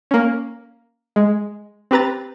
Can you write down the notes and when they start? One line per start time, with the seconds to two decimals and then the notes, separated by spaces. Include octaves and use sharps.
0.11 A#3 C#4
1.16 G#3
1.91 C4 G4 B4 A#5 A6